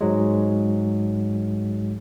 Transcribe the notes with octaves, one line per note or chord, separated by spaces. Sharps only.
G#2 F#3 G#3